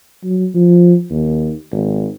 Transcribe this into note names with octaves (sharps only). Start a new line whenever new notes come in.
F#3
F3
D#2
G#1